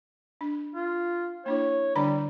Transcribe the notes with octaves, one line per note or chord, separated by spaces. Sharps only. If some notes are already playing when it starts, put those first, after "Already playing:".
D4
F4
A#3 D4 E4 C#5
D3 G3 D4 A#5